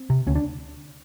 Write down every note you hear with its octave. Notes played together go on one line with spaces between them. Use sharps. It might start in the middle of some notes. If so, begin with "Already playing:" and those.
Already playing: C4
C3
D2 C#4
D4